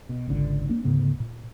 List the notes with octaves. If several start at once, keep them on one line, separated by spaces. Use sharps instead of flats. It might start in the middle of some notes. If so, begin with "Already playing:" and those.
B2
G#1 C#2 D3
A#3 D4
D2 G#2 C#3 B3
A#2